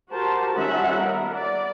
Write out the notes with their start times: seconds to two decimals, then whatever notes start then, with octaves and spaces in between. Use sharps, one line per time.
0.12 F#4 G4 A#4 C5 A5
0.56 D#3 G3 C#4 F4 E5 F#5
0.95 B3 A#4
1.35 D5